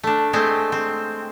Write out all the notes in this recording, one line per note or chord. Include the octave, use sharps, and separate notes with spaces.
A3 D4
G#3 A3 C4
C4